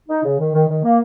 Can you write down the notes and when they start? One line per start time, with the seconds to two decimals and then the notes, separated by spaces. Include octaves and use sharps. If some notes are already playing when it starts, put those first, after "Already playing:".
0.08 D#4
0.24 C#3
0.39 D#3
0.53 D#3
0.68 D#3
0.83 A#3